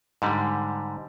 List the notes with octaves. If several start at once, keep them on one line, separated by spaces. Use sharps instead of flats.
G#2 D3 G3